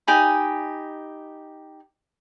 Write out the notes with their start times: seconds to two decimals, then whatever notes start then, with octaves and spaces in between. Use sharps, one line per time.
0.07 D#4 G4 G#5 B5